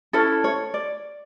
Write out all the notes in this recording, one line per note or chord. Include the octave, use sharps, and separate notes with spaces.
C#4 E4 A4 C#5
C#5
D5